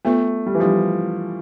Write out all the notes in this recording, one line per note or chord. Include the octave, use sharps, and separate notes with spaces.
A3 B3 F4 B4
G3
E3
F3 G3 D4 G4 C5